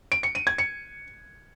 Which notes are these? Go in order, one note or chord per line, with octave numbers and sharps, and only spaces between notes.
D7
C#7
D#7
G#6
C#7